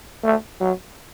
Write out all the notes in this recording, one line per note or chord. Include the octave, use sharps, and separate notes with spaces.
A3
F#3